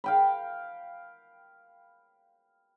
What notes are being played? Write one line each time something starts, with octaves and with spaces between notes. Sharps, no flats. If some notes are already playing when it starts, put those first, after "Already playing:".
F5 G5 B5